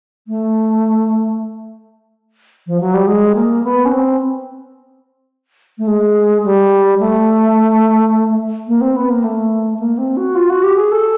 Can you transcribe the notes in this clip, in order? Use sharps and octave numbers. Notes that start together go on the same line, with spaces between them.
A3
F3
F#3
G3
G#3
A#3
B3
C#4
C4
A3
G#3
G3
A3
A#3
C4
B3
A#3
A3
A#3
C4
F#4
F4
F#4
G4
G#4
A4